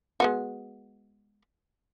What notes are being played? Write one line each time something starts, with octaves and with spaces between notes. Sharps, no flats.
G#3 B3 F#4